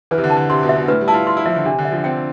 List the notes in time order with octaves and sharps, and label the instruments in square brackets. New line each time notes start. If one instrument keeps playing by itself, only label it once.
[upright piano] E3 [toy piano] B4
[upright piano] C3
D3
[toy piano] A5
[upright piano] D3
[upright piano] C3 [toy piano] C6
[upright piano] B2
[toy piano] E5
[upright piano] B2
[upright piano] A2 [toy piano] B4
[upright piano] G3
[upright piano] E4 [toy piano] A5
[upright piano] F4
[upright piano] F4 [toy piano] C6
[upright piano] E4
[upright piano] F3 [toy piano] E5
[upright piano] D3
[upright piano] C3 [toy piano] D4
[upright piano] D3
[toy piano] E5
[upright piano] F3
[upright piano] C4 [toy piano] G5